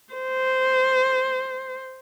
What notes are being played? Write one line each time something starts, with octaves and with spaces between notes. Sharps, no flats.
C5